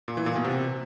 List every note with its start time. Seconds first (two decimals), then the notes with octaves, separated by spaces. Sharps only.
0.08 A#2
0.17 E3
0.26 A#2
0.35 B2
0.45 C3